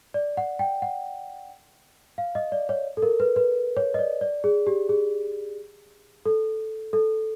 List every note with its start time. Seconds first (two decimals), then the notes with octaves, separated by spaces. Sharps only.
0.14 D5
0.37 F#5
0.59 G5
0.82 F#5
2.18 F5
2.35 D#5
2.52 D5
2.69 C#5
2.97 A4
3.02 A#4
3.20 B4
3.36 B4
3.77 C#5
3.94 D#5
3.99 D5
4.21 D5
4.44 G#4
4.67 G4
4.89 G#4
6.26 A4
6.93 A4